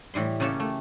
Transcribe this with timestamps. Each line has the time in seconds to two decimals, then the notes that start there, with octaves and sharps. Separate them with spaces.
0.14 A2 E3 G3 C6
0.40 C#3 A#3 C#4 G4 A4 A5
0.60 A3